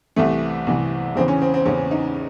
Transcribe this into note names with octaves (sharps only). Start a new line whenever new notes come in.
C2 C3 E3 A3
C2 C3 E3
E2 C#3 E3 C4
C#4
C4
C4
E2 C#3 E3 C#4
D#4